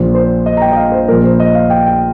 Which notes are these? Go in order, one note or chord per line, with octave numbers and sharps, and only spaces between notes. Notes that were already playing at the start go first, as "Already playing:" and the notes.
Already playing: A#1 A#2 C5
C5
D#5
A#5
G5
D#5
F5
C5
A#1 A#2 A#4
C5
D#5
F5
G5
G5